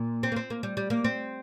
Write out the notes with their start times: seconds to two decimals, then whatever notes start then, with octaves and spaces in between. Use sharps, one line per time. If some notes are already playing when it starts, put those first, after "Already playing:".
Already playing: A#2
0.23 C4
0.32 A#3
0.36 C4
0.50 A#3
0.63 G3
0.77 G3
0.90 A#3
1.04 C4